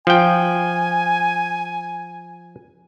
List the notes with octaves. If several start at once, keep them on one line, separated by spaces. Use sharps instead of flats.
F3 G5 G#5